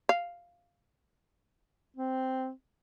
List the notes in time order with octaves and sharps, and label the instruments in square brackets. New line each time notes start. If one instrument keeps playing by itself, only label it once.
[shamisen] F5
[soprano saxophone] C4